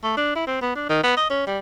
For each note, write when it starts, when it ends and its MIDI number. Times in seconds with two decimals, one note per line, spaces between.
0.03 0.16 57
0.17 0.35 62
0.36 0.46 64
0.47 0.59 60
0.61 0.74 59
0.75 0.89 62
0.89 0.98 51
1.03 1.12 59
1.17 1.27 75
1.30 1.43 61
1.47 1.58 55